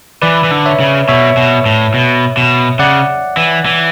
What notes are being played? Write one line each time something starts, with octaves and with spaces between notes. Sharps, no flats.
E3 B4 D5
E3
D3
C#5 E5
C#3
B2 C#5 E5
B2
A2
B2
B2
C#3 D5 F#5
E3
E3